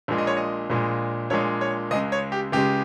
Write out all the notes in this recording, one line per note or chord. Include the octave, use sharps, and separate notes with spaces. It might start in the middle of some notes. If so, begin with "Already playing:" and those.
A#1 A#2 G#3
D#5
C#5
D#5
A#1 A#2 G#3
A#1 A#2 G#3 C#5
C#5
C#2 C#3 G#3 D#5
C#5
G4
C#2 C#3 G#3 G4